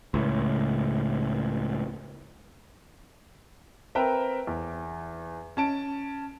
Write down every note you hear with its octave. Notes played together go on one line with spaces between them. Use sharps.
C#2 A2
C4 A#4 B4 E5 G5 A#5
E2
C#4 A5 D7